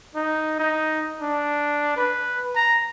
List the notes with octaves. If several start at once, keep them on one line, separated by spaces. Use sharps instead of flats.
D#4
D#4
D4
B4
A#5